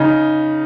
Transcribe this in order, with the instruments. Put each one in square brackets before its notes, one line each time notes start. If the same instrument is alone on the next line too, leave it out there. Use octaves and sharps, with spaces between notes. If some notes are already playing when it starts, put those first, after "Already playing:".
Already playing: [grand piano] C#3 D#4